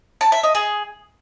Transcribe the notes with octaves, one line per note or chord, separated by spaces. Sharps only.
A5
E5
D#5
G#4